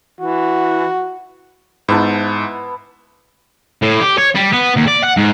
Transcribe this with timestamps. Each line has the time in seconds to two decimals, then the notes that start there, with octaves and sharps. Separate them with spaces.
0.20 E3 F#4
1.88 G#2 B3 E4 A5
3.82 A2
4.01 G4
4.18 C#5
4.35 G3
4.53 B3
4.76 D#2
4.87 D5
5.03 F#5
5.17 G#2